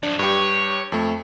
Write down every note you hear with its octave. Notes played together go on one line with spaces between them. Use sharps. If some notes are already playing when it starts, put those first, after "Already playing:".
F#2 F3 D4
G2 G4 C#5
F2 A3